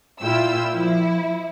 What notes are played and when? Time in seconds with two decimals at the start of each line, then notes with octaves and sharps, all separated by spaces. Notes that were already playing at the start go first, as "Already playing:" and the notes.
0.22 A#2 E4 F4 G5 E6
0.74 F3 E4